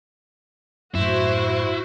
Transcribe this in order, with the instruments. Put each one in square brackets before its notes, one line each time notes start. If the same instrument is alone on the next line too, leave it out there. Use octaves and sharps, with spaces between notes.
[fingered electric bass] F#2 A2 [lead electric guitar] E4 [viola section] F#4 C5